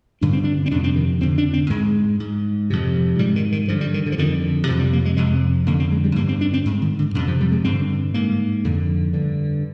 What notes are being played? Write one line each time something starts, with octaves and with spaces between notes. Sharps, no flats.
G2 D3 D4
C4
D4
C4
F2 C3 D4
C4
D#3
F2 D3 C4
D4
C4
G#2 G#3
G#2
F2 C3
G#2 G3
D#3
D#3
G2 D3 F3
G3
D#3
D3
F3
F2 D3 D#3
F2 C3 F3
G3
A#3
G#3
F2 C3 G#3
F2 D3 A#3
C4
G#3
G3
G2 D3 A#3
C4
D4
C4
G#2
D#3
D3
F2 C3 D#3
F3
G3
G#3
G2 D3 C4
G#2 A#3
F2 D3
G2 D3